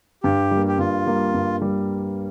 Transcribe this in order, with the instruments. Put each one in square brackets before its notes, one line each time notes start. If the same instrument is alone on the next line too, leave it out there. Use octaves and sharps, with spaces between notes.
[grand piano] G2 [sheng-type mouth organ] G4
[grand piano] G3 A#3
[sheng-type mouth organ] G4
[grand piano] G2 [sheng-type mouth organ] F4
[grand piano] G3 A#3
G2
G3